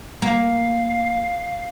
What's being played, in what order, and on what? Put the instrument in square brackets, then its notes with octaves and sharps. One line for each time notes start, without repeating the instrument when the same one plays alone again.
[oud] A#3 [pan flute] F5